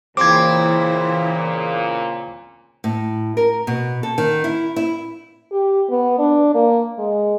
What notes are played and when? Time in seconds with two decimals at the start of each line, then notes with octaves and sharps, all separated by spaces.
0.17 A#2 C#3 E3 A#3 C4 E4 D6 G#6
2.84 A2
3.37 A#4
3.67 B2
4.03 A4
4.18 D#3
4.44 E4
4.76 E4
5.52 G4
5.90 B3
6.18 D4
6.54 A#3
6.98 G#3